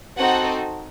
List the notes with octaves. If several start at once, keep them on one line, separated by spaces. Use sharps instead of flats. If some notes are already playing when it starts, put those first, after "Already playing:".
C4 D#4 F#4 A4 F#5